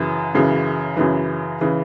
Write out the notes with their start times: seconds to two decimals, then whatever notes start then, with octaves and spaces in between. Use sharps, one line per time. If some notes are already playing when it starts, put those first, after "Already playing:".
Already playing: F#2 C#3 E3
0.34 F#2 C#3 E3
0.97 F#2 C#3 E3
1.61 C#3 E3